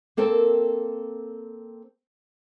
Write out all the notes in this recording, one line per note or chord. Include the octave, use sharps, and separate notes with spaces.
A#3 C4 A4 A#4 C5 G5